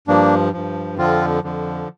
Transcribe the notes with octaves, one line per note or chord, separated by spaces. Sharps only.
G2 F3 A#3 D4
G2 F3
F2 D3 F3 C4 F4
F2 D3 F3